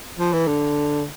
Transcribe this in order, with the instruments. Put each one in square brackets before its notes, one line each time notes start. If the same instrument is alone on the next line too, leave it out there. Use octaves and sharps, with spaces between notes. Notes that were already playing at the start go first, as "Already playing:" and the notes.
[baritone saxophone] F3
E3
D3